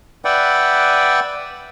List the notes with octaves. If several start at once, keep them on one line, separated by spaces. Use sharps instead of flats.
B4 D5 E5 F#5 G5